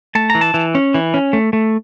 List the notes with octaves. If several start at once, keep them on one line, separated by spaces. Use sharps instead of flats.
A3 A5
E3 A#5
A5
E3
C#4
E3
C#4
A3
A3